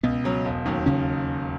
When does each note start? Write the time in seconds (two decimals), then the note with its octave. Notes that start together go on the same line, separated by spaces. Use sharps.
0.03 C#2 B2 B3
0.24 C#3 F#3 C#4
0.45 E1
0.65 D#2 D#3 F#3 C#4
0.86 C#3 C#4